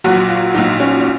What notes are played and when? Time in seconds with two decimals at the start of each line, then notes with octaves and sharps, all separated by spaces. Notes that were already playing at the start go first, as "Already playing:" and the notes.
0.04 A#1 A#2 F#3 F#4
0.28 F4
0.54 A#1 A#2 F#3 D#4
0.80 C#4
1.01 C#4